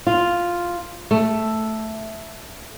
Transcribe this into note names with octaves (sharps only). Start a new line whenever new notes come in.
F4
A3